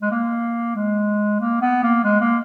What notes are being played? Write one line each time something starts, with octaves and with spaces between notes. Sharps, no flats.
G#3
A#3
G#3
A#3
B3
A#3
G#3
A#3